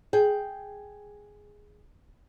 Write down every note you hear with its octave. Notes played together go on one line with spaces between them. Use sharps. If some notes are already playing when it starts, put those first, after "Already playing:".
G#4 G5